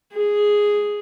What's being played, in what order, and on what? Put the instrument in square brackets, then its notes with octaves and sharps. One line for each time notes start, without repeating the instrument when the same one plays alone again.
[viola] G#4